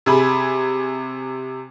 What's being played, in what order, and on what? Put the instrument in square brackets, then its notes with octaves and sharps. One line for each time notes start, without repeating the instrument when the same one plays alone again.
[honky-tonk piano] C3 G#4 B5